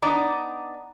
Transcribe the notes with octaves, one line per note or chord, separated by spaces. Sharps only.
B3 D4 D#4 D5 A#5